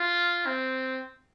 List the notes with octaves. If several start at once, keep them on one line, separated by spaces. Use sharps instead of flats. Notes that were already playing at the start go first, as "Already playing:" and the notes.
Already playing: F4
C4